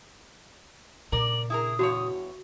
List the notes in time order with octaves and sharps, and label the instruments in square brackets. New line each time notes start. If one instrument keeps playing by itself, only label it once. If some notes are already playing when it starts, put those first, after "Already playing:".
[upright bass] A#2 C#3 [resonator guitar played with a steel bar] A#4 D5 [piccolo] F#7
[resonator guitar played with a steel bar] E4 G#4 A#4 [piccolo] D#6
[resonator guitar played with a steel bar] E2 G2 C#5 [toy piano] F#4